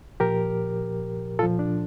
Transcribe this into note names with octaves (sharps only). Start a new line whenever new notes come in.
A#2 F3 G4 A#4
A#2 F3 F4 A4
D4